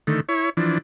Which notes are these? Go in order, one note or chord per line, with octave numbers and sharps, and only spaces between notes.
D3 D#3 A3
E4 C#5
E3 F3 D4